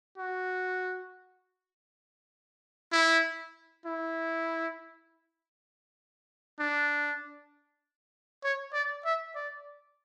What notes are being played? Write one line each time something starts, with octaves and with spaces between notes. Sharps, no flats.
F#4
E4
E4
D4
C#5
D5
E5
D5